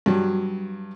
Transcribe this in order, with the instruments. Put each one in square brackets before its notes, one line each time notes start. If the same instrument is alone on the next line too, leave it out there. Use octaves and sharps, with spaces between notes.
[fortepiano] G2 F#3